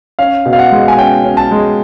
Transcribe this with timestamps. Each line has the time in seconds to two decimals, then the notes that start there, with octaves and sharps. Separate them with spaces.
0.19 C#4 F5
0.46 B2
0.53 F5
0.59 F#5
0.72 G#3
0.88 G#5
0.98 C#4 G5
1.24 C#4
1.37 A5
1.51 G#3